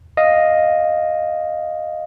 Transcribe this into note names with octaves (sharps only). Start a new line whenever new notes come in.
D#5 F5